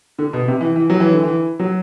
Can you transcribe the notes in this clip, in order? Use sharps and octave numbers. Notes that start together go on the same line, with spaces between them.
D3
B2
C3
E3
E3
F#3
E3
D3
E3
F#3